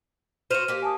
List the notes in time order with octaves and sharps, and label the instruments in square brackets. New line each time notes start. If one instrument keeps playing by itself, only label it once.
[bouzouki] F#4 C5 [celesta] F6 D#7 F7
[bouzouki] A#3 G4
[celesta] G#5 A5 D#6